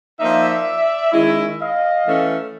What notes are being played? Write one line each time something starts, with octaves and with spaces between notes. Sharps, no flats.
F3 A#3 D#4 D5 E5
D#3 G#3 C#4 E4
D#5 F5
E3 A3 C#4